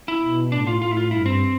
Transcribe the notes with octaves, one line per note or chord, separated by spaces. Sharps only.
E4
B2
A2 D4
F4
A2 F4
E4
F4
G2 E4
C4